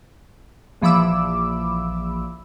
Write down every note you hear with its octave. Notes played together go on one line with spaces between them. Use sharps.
A#1 E3 F3 B5 D6 E6